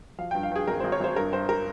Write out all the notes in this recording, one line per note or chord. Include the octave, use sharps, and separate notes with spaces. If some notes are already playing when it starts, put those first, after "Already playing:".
F3 F5
G2 G5
F5
G2 G#4
G#1 A#4
G#1 C5
C#5
G#1 C5
G2 A#4
G2 C5
A#4